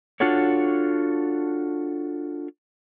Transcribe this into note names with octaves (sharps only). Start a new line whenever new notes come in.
D4 F4 F#4 A4 C#5